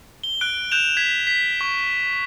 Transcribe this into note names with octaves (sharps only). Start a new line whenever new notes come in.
G7
F#6 D7
F#6 G6 E7 F7
G#6 B6
B6
C#6